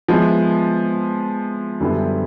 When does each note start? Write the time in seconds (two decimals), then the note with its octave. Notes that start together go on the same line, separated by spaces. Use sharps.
0.08 F3 G#3 B3 E4 G#4
1.80 F#2 D3 G3 B3 E4